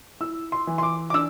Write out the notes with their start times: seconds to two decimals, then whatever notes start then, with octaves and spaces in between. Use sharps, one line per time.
0.21 E4 E6
0.52 C6
0.67 E3
0.78 C6
0.83 D6
1.10 D6
1.14 D4 E6